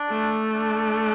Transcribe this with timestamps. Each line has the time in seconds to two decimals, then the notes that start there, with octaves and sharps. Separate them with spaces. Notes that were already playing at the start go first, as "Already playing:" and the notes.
Already playing: D4
0.10 A3
0.53 D4